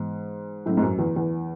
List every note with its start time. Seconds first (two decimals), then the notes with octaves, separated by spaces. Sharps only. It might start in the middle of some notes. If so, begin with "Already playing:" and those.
Already playing: G#2 E3 B3
0.66 A2 F#3 A3 C#4
0.77 G#2
0.82 F#2
0.99 E2
1.16 E2